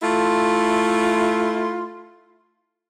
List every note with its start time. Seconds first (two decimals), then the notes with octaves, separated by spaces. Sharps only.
0.03 A3 E4 F4